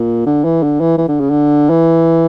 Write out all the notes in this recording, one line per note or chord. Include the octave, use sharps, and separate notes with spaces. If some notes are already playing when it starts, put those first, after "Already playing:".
Already playing: A#2
D3
E3
D3
E3
E3
D3
C#3
D3
E3